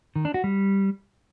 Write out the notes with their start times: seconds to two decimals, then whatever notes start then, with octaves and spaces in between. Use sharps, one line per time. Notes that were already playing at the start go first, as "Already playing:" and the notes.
0.16 D#3
0.25 D4
0.34 F#4
0.44 G3